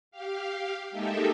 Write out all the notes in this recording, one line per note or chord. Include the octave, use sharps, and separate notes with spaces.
G4 F5
G#3 A#3 D#4 G4 A4 E5